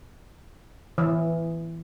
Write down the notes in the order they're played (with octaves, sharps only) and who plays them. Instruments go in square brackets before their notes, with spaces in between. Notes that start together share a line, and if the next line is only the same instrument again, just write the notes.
[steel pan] E3